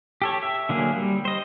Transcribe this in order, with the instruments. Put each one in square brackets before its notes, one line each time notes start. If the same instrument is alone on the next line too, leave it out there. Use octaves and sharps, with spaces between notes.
[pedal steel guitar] G4 A4 C#5
E5
D3 F#3 A#3 G#4
G3
C5 D#5